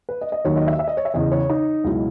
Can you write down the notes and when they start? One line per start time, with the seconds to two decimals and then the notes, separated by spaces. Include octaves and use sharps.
0.09 B4
0.21 D#5
0.32 D#5
0.45 D#2 D#3 F#3 C#5
0.56 D#5
0.67 E5
0.79 E5
0.88 D#5
0.97 C#5
1.05 E5
1.14 E2 C#3 E3 D#5
1.31 C#5
1.50 D#4
1.84 C#2 B2 F#3 E4